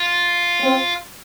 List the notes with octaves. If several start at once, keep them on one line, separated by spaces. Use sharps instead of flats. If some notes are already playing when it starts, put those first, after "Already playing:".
Already playing: F4
C4